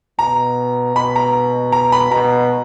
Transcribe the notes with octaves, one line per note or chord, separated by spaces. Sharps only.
B2 A#5
B2 B5
A#5
A#5
B5
B2 A#5